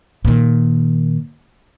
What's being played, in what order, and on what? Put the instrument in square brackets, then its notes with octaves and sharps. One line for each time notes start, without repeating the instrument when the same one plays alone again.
[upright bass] A#2 D#3